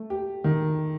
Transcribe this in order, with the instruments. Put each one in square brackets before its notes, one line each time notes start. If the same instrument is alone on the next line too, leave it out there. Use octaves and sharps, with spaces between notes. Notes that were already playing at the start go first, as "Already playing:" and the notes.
Already playing: [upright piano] A3
G4
D#3